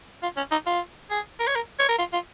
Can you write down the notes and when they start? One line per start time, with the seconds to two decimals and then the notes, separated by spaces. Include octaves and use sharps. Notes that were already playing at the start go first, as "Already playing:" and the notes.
0.23 F4
0.37 C#4
0.51 D#4
0.66 F4
1.10 G#4
1.39 A#4
1.47 C#5
1.55 A#4
1.79 C#5
1.89 A#4
1.98 F4
2.13 F4